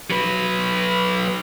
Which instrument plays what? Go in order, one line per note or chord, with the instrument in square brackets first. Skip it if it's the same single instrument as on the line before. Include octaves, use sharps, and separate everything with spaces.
[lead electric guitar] F#3 B4